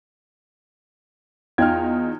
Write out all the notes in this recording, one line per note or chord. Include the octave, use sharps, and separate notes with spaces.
E2 D#4 F4 G5 F6 G#6